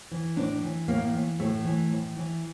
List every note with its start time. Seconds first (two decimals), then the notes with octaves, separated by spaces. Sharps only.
0.11 E3
0.36 A2 D4
0.62 E3
0.88 A2 A#3
1.13 E3
1.39 A2 A3
1.65 E3
1.90 A2
2.16 E3